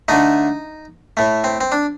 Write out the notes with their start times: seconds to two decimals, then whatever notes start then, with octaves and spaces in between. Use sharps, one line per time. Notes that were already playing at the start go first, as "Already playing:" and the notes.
0.08 D3 A3 D#4
1.17 A2 A3
1.44 C4
1.61 C4
1.72 D4